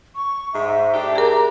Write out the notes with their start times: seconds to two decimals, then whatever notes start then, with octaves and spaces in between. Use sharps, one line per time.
0.15 C#6
0.54 G#2 E5
0.92 A3 D4 G4
1.15 G#4 A#4 A#5